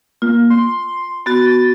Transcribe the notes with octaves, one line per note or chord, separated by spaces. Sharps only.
A#3 F4
C6
B3 F#4 A6